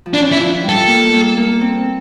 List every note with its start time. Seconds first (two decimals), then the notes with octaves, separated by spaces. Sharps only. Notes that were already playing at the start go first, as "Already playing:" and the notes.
0.06 F3
0.13 E3 D4
0.32 E4
0.39 F3
0.63 G3
0.69 A4
0.87 A#3
1.13 A#3
1.37 A#3
1.61 C4